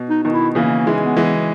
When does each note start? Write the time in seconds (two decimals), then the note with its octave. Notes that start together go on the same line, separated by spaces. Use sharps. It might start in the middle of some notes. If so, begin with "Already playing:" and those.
Already playing: B2
0.10 D#4
0.23 B2 D#3 D#4
0.33 E4
0.55 C#3 E3 A#3
0.87 E3 G#3
1.02 B3
1.17 E3 G#3